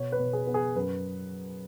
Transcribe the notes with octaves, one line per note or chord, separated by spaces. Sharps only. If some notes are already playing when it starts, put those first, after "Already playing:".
Already playing: B2 C#5
B4
B2
G#4
B3
G#4
F#2 B4